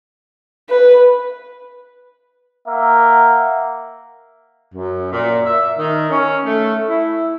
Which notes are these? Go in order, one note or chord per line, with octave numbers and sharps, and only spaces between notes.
B4
A#3 E5 F#5
F#2
A#2
E5
D#3
C#4
A3
E4